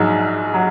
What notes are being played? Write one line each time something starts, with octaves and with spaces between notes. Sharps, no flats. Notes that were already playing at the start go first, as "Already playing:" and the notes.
Already playing: A#1 G#2 F#3
F#3